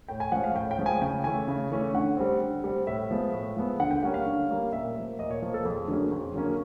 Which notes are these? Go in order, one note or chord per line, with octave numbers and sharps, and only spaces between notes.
A2 G5
G#5
F3 G#3 C#4 F#5
F5
A2 G5
G5
F3 G#3 C#4
G#5
C#3 G5
E3 A3 C#4 G#5
C#3
E3 A3 C#4
D3 F#5
G3 C4
D3
G3 C4
A2 E5
F3 G#3 B3
A2
F3 G#3 B3
D3 F#5
G5
G3 A#3 C#4 F#5
F5
D3
G3 A#3 C#4
A#2 E5
F3 A#3
A#2 D#5
C#5
F3 A#3
A4
F2 G#4
D3 F#3 A#3 C#4
F2
D3 F#3 A#3 C#4